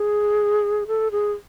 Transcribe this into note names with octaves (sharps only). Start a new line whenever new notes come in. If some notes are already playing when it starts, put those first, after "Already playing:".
Already playing: G#4
A4
G#4